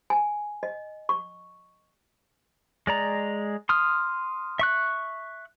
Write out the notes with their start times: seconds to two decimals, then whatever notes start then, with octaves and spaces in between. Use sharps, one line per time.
0.10 G#5
0.63 D#5
1.09 C#6
2.87 G#3 D5 A#5
3.69 C6 D#6 F6
4.59 E5 C#6 F#6